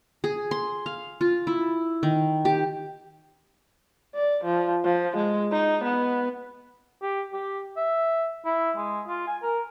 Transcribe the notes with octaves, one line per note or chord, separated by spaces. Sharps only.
G#4
C6
F5
F4
E4
D#3
G4
D5
F3
F3
G#3
D#4
B3
G4
G4
E5
E4
G#3
F4
G#5
A#4